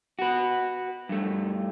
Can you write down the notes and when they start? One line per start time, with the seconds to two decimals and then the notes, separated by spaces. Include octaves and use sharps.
0.19 F#4 B4
1.09 G2 A3